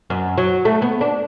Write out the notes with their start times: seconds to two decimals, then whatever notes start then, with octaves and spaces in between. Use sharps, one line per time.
0.10 F#2
0.37 F#3
0.65 A3
0.82 B3
1.01 D4